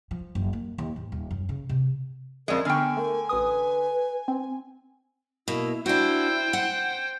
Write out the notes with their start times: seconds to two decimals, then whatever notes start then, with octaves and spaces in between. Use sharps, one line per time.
0.11 F3
0.35 F#1
0.53 A#3
0.78 D#2
0.96 G#2
1.12 D#1
1.31 F#2
1.49 C#3
1.69 C3
2.48 F2 G#3 A#4 D5
2.65 D3 B3 G5 G#5 C#6 F6
2.97 A3 A#4
3.29 A1 B4 D#6
4.28 C4
5.48 B2 A#3 E4
5.86 D4 E4 F#4 C5 G5
6.53 F#5